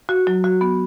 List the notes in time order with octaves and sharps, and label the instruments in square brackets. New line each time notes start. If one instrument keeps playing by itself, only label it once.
[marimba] F#4
F#3
F#4
B3